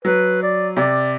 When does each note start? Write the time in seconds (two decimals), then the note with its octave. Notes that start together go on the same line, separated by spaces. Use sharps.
0.05 F#3 B4
0.43 D5
0.77 C3 D5